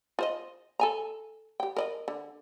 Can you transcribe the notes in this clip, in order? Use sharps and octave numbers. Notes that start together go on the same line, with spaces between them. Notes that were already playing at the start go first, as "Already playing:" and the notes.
F4 C5 D#5
A4 G#5 A#5
G4 G5
A#4 D5 D#5
D3